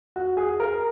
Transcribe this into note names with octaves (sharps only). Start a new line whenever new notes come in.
F#4
G#4
A#4